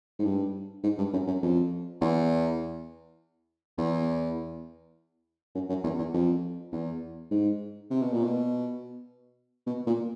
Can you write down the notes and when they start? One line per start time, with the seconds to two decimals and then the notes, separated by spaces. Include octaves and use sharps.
0.19 G#2
0.25 G2
0.83 G#2
0.98 G2
1.13 F#2
1.27 F#2
1.42 F2
2.01 E2
3.78 E2
5.55 F#2
5.69 F#2
5.84 E2
5.99 E2
6.14 F2
6.72 E2
7.31 G#2
7.90 C3
8.02 B2
8.13 A#2
8.24 B2
9.67 B2
9.86 A#2